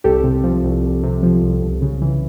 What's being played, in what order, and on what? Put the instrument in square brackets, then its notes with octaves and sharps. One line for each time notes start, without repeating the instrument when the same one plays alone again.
[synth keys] C2 G4 A4
C3
F3
C2
C2
C3
F3
C2
C#2
C#3
E3